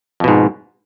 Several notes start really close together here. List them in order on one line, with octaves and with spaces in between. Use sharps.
F2 B2 G#2